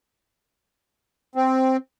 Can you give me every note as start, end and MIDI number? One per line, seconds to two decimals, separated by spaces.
1.35 1.77 60